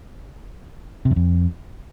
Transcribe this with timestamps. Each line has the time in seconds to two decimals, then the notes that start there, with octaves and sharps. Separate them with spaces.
1.05 C3
1.11 F#2
1.16 F2